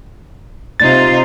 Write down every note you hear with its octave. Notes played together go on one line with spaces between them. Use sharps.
C3 D#4 F4 A6